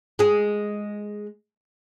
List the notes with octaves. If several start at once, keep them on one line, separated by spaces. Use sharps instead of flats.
G#3 G#4